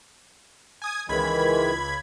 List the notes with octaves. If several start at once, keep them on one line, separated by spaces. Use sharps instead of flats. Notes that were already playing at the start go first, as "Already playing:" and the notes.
G#5 D#6 G#6
C#2 D#3 E3 G#3 B5 G#6